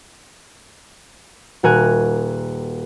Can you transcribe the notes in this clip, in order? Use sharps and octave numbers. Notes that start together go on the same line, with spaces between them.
D#1 F#4 A#4 G#5 F#6